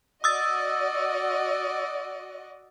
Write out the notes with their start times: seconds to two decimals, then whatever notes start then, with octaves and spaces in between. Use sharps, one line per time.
0.24 F#4 D5 D#5 D#6 E6 A6